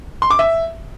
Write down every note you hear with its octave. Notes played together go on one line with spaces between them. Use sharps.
C6
D6
E5